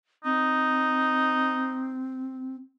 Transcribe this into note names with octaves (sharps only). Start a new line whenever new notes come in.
C4 D#4